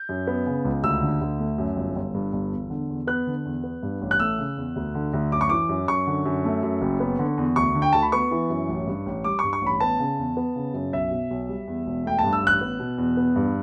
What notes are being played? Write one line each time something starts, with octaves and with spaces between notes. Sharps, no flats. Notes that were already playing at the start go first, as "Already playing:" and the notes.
Already playing: G6
F#2
B3
C#3
C#2
D2 E6
D3
D2
A3
F#2
G1
G1
G2
G1
E2
D3
E2
B3 F#6
D3
E2
B3
G2
A1
F#6
A3 E6
C#3
E2
D2
D3
D2
F#2 D6
C#6
E3 D6
F#2
F#2 C#6
D3
F#2
A3
F#2
F#1
B3
D3
E2
D2 C#6
D3
G5
D2 A5
B5
B3 C#6
E3
F#2
A1
G2
A1
G3 D6
G2 C#6
C#6
A1 B5
B3 A5
C#3
E2
B3
C#3
F#2
B1 E5
B2
B1
G3
E2
E1
A3 G5
A5
G2
E6
A1 F#6
B3
B2
E2
B3
G2